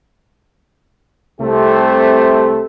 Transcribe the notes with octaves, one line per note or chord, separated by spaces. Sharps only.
C2 C3 A3 G4 A4 C5